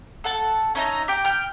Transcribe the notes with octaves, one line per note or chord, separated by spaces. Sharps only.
A4 F#5 A5
C#4 D#4 E5 A#5
G4 G5
G5 F6